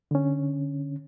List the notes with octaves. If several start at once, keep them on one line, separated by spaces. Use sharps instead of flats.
D3 C#4